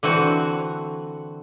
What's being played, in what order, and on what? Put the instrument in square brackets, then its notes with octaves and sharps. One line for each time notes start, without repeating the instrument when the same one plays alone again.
[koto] D3 E3 C4 F#4